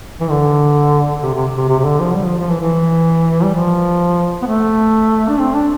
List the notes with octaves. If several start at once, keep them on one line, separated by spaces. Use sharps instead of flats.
E3
D3
C3
C3
C3
C3
C3
D3
F3
G3
F3
F3
E3
E3
G3
F3
B3
A3
D4
C4
D4